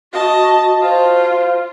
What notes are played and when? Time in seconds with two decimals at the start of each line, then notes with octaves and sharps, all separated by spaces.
0.13 F#4 D#5 A5
0.82 F4 C5